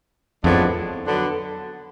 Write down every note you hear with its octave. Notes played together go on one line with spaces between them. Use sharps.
F2 A2 F3 G#3 B3 D4
D3 F#3 B3 D4